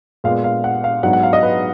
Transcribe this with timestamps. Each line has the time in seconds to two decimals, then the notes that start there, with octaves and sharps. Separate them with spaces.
0.24 A#2 G#3 B3 F5
0.44 F5
0.64 F#5
0.84 F5
1.03 G#2 F#3 B3 D4 F#5
1.13 F#5
1.23 F5
1.33 D#5
1.43 B4